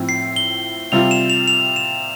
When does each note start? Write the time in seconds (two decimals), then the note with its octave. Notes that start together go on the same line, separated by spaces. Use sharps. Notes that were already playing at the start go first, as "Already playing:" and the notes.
Already playing: A2 F3 C4
0.09 C7
0.36 G7
0.92 C3 G3 C4 F4 F7
1.11 E7
1.30 F7
1.48 F7
1.76 E7